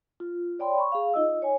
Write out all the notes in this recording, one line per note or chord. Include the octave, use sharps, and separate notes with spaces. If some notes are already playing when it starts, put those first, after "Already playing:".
F4
C#5 D5 G5 B5 C6
B5 C#6
G#4 F5
D#4 F4 D#5 E6
C#5 G#5